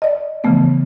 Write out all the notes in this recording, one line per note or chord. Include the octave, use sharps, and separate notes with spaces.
D5 D#5
C#3 E3 F3 A3 B3